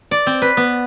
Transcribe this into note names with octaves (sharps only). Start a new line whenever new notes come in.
D5
C4
B4
B3